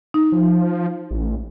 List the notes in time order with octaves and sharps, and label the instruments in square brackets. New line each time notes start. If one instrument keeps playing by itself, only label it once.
[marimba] D#4
[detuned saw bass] F3
A1